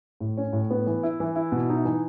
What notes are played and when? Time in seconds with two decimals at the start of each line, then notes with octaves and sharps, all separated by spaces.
0.20 A2
0.37 C#4
0.53 A2
0.70 B3
0.87 E3
1.03 E4
1.20 E3
1.35 E4
1.52 B2
1.69 D#4
1.85 E3